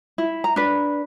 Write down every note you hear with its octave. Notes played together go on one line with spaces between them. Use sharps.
E4
A#5
D4 B4